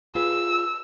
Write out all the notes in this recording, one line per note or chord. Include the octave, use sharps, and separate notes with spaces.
F4 G#4 B4 E6